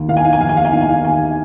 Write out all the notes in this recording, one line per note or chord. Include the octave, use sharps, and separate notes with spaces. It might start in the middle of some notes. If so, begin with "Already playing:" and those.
Already playing: D#2
D#3 F5
G#5
F5
G#5
D#2 F5
G#5
F5
G#5
D#3 F5
G#5
F5
D#2 G#5